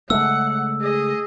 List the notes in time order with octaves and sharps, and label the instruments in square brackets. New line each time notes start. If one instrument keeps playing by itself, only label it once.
[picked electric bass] C#3 G#3 A3 [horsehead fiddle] F#5 [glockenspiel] E6
[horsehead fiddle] G#4 D#5